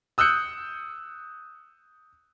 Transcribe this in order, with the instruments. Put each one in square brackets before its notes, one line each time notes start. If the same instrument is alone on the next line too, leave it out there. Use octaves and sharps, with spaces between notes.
[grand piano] D#6 E6 F#6 G6 C#7